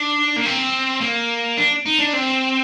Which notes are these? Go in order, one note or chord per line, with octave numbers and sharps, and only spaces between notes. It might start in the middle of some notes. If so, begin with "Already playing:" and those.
Already playing: D4
A#3
C4
A#3
D4
D#4
D4
C4